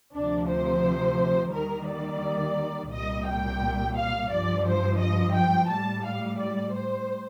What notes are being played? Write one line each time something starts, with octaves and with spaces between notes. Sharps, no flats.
D2 C3 F3 D4
C5
D#2 D#3 G3 A#4
D5
C2 A#2 G3 D#5
G5
F5
G2 F3 D5
C5
D#5
G5
A2 G3 A5
F5
D5
C5